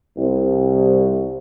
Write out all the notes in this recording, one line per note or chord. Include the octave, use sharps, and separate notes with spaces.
C2